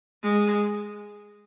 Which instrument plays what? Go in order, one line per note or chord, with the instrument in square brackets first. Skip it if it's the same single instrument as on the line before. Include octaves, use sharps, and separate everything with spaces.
[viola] G#3